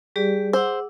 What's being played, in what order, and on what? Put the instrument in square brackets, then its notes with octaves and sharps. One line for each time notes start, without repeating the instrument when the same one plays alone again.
[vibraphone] G3 G4 D5 [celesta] G#4
[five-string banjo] C5 [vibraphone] F#5 D6 E6